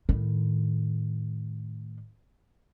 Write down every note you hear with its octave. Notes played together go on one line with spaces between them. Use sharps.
A2 D#3